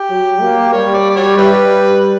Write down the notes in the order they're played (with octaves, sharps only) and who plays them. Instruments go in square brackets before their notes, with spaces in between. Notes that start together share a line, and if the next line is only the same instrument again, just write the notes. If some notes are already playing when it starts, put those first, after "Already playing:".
Already playing: [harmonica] G4
[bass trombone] F#3
A#3
[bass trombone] G3 [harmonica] C#5
[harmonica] D5
D5
F#4 C#5
[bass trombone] G3 [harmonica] E4 G4 B4